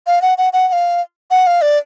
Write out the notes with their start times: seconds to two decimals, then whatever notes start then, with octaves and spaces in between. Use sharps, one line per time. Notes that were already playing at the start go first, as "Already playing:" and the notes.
0.07 F5
0.22 F#5
0.38 F#5
0.53 F#5
0.68 F#5
0.73 F5
1.31 F#5
1.47 F5
1.62 D5